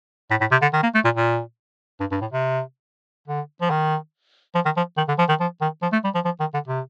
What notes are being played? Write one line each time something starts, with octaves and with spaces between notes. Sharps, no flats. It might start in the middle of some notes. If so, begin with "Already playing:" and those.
A2
A2
C3
D3
D#3
A#3
A3
A#2
A#2
G2
G2
A2
C3
D3
F3
D#3
F3
D#3
F3
D#3
D3
F3
D#3
F3
D#3
F3
A3
G3
F3
F3
D#3
D3
C3